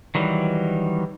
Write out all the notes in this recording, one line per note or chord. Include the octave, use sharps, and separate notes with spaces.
D#3 E3 F#3 G3